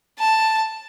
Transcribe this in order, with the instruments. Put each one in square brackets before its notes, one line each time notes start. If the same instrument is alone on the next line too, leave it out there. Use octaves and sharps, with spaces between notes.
[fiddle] A5